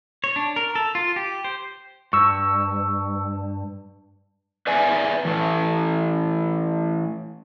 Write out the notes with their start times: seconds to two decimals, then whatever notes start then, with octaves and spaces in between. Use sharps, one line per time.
0.24 C#5
0.36 D4
0.56 A#4
0.75 A4
0.95 F4
1.16 G4
1.44 C5
2.13 G2 C#6 E6
4.67 B4 D5 E5 G#5
5.25 E3 A3